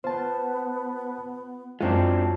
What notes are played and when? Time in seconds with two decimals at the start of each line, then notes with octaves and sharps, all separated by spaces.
0.04 B3 F4 C5 A5
1.81 F#2 G#3 C4 D4 E4 F4 C#7